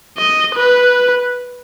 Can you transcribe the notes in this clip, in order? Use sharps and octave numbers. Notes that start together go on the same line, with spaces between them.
D#5
B4